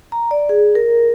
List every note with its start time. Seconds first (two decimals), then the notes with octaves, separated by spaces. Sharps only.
0.12 A#5
0.31 D5
0.49 G#4
0.75 A#4